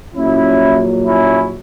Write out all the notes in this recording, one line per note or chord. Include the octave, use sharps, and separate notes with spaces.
A#1 A#2 F#3 C#4 E4
C#4 E4